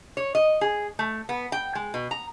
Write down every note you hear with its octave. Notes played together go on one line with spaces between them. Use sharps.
C#5
D#5
G#4
A3
B3
G5
G#3
B2
A#5